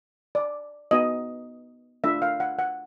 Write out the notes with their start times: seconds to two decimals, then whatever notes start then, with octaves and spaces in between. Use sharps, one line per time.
0.35 D5
0.91 B3 D#4 F#4 D#5
2.04 A3 D4 F4 E5
2.22 F5
2.40 F#5
2.59 F#5